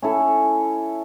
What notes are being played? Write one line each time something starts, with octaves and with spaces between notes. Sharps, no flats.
C#4 E4 A4